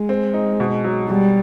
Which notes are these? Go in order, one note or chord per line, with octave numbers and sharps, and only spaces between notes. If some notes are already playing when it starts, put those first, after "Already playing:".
Already playing: G#3
C4
D#4
B2
F#3
B2 G3